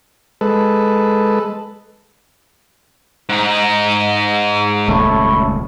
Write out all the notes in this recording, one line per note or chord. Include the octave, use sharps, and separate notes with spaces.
G#3 A4 B4
G#2 D#4
D#1 C#2 A3 E4 A4 C#5